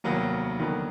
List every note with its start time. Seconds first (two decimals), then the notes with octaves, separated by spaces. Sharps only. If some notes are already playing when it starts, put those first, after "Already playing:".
0.04 F1 D#2 D#3 F#3 A#3 B3
0.60 F2 D3 D#3 F#3 B3